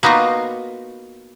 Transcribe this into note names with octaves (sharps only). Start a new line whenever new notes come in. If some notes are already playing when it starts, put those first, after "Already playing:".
A#3 B3 D#4 F4 F#4